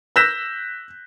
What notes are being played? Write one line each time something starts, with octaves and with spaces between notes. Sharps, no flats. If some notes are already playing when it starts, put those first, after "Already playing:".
E6 F#6 G6 A#6 B6 E7